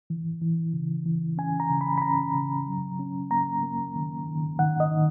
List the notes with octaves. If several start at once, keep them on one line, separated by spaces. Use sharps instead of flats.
E3
E3
C#3
E3
C#4 G#5
A#5
C#3
B5
B5
C#4 A#5
C#3
F#3
C#4
A#3 A#5
A#3
D#3
D#3
D#3 F#5
D#5
D#3